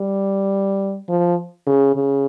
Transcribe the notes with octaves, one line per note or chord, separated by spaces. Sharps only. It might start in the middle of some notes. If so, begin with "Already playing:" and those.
Already playing: G3
F3
C#3
C#3